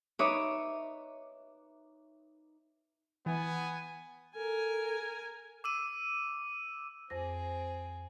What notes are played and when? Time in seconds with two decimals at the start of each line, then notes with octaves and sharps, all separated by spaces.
0.19 D#4 B4 C#5 E5 D6 D#6
3.26 E3 B3 G#5
4.35 A4 A#4 G#5
5.64 D6 E6 D#7
7.10 F2 C4 G#4 C5 A#6